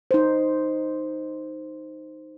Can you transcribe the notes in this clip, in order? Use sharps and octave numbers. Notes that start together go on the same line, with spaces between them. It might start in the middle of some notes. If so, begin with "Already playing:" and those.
D#4 C5